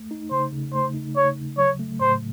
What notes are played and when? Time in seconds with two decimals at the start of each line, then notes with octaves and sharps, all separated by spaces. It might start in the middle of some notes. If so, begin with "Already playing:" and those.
Already playing: A3
0.11 D#4
0.31 C#3 C5
0.52 C#3
0.73 A3 C5
0.94 D#4
1.16 C#3 C#5
1.37 C#3
1.57 F#3 C#5
1.79 A3
2.00 A2 C5